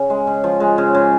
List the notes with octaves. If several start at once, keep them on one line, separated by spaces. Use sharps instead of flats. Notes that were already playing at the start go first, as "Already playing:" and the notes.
Already playing: C#3
G#3
C#3
F3
G#3
C#3
C#3